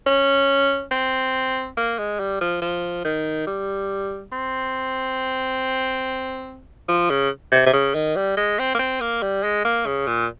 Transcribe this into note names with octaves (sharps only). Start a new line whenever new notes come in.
C#4
C4
A#3
G#3
G3
F3
F3
D#3
G3
C4
F3
C#3
C3
C3
C#3
D#3
G3
G#3
C4
A#3
C4
A#3
G3
G#3
A#3
C#3
A#2